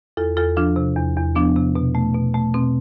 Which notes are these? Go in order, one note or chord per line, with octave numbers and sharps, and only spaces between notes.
E2 F4 A4
E2 F4 A4
F3 D4 F4
C3
E2
E2
F3 B3 D4
C3
B2
A3
B2
A3
B2 C4